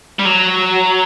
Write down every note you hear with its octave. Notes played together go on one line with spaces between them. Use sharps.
G3
F#3